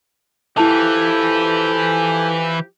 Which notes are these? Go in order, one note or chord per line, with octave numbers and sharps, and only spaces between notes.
E3 F3 E4 G4 A4 A5